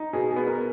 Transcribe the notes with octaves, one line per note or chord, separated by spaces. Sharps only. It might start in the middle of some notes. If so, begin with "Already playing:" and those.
Already playing: D#4
B2 G#4
G#4
B3
A#4